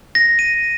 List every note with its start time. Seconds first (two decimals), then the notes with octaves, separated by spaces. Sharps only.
0.15 A#6
0.39 D#7